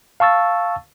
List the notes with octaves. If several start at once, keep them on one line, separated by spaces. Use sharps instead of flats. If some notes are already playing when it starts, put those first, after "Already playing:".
F5 A5 C#6 E6 A6